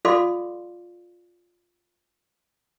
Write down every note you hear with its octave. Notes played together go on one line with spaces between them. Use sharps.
F4 A4 D5 F5 C6 D6